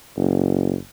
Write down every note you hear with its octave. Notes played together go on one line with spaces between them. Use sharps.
F#1